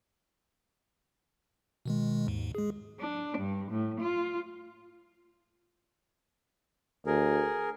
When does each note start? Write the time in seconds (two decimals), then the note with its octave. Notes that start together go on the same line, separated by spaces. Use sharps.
1.85 B2 D#3 G#3
2.28 D#2 G#2
2.55 G#3 G#4
3.01 D4
3.38 G2
3.70 A2
4.01 F4
7.06 D2 G#4 A#4